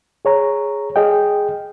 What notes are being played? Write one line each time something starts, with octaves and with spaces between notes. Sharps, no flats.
G#4 C#5 A#5
G#4 D#5 G5